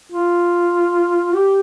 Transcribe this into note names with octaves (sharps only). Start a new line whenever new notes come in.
F4
G4